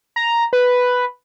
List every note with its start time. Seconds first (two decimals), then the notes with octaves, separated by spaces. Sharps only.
0.16 A#5
0.53 B4